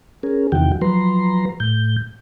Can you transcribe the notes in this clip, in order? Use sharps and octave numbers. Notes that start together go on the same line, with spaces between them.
C#4 G#4 A#4
E2 C3 D#3 E3 F#4 G5
F3 F#3 B4 A#5 C6
A2 G6